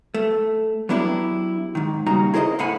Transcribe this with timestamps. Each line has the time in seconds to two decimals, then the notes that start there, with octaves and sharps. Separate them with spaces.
0.15 A3
0.89 F#3 B3 D4 E4 G4
1.75 G#2 D#3
2.06 C#3 G3 A#3 D#4 F#4 A#5
2.34 E4 G#4 A#4 C5 D5 D#5
2.59 A2 D3 F5 F#5 G#5 B5